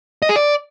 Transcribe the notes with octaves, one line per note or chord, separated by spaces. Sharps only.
D#5
G#4
D5